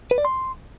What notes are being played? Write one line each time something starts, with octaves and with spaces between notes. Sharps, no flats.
B4
D5
C6